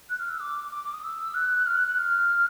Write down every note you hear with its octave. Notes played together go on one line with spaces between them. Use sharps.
F#6
F6
E6
D6
D6
D6
D#6
E6
F#6
F6
F#6
F#6
F6